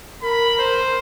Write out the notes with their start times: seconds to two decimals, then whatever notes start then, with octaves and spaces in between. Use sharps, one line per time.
0.22 A#4 B5
0.58 C5